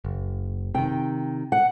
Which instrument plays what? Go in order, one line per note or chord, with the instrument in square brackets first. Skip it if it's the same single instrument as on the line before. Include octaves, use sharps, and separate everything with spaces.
[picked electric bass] F#1
[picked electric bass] C3 D#3 [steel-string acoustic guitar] G5
[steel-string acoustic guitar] F#5